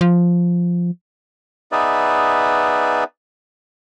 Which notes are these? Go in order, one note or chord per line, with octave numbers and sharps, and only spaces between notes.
F3
B3 D#4 G#4 B4 D5 E5